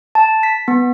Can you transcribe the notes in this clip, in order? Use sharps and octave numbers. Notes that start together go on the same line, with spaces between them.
A5
B6
B3